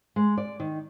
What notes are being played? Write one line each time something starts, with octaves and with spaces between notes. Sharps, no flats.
G#3
D5
D#3